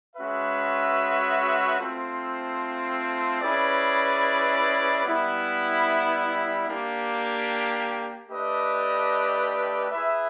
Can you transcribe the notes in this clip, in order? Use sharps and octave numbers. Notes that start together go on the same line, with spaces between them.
G#3 C#4 F#4 B4 E5
A3 C4 F4 A4 C5
C#4 E4 G#4 B4 D5
G3 B3 E4
A#3 D4 G4
A3 D4 G4 B4 D#5
E4 G#4 B4 E5